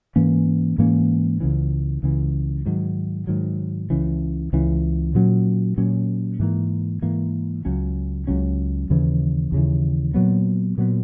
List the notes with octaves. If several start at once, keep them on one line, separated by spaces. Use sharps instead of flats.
G#2 E3 A#3 C#4
G#2 E3 A#3 C#4
C#2 C#3 E3
C#2 C#3 E3
G#2 D#3 F#3
G#2 D#3 F#3
C#2 C#3 E3
C#2 C#3 E3
A#2 F#3 C#4
A#2 F#3 C#4
G#2 E3 A#3
G#2 E3 A#3
C#2 C#3 F#3 C#4
C#2 C#3 F#3 C#4
D#2 C#3 E3
D#2 C#3 E3
A#2 F#3 B3
A#2 F#3 B3